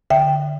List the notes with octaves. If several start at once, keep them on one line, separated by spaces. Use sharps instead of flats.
D3 E5 G5